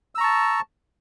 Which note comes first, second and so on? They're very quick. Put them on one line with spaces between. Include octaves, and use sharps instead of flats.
E6 A#5 C#6 A5